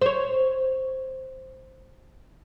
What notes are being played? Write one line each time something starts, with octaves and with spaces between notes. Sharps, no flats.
C5 C#5